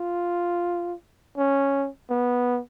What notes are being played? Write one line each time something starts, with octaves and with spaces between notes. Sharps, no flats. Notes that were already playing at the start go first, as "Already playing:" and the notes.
Already playing: F4
C#4
B3